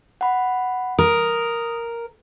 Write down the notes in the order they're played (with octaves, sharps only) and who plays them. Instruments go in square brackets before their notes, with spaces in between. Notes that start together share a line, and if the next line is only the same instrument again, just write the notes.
[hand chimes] F#5 B5
[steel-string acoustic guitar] A#4 [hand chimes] D#6